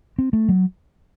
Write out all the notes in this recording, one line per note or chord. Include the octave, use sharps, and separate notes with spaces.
C4
A3
F#3